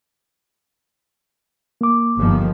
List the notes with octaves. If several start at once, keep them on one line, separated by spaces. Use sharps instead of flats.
A#3 D6
G1 D#3 F3